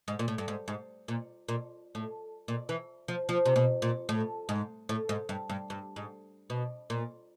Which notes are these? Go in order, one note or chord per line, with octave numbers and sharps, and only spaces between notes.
G#2
A#2
A2
G2
G#2
G#2
A#2
A#2
A2
A#2
E3
F3
F3
C3
B2
A#2
A2
G#2
A2
G#2
G2
G2
G2
G#2
B2
A#2